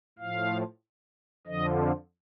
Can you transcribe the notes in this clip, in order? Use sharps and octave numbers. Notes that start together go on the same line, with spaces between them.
A2 F3 F5
F2 D3 F3 D#5